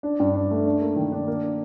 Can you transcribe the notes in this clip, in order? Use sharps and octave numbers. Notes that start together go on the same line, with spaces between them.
D4
G2
D4
A3
D4
A#3
D#3
D4
A#3